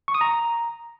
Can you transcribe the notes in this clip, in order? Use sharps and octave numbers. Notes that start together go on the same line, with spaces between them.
C#6
D#6
A#5